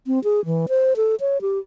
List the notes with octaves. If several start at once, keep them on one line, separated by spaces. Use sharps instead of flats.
C4
G#4
E3
C5
A4
C#5
G4